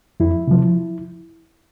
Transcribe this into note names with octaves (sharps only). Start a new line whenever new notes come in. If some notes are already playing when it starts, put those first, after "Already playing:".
F2 E4
C3 F3